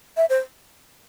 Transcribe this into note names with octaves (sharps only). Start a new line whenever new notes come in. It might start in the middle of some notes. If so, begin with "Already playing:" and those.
E5
C5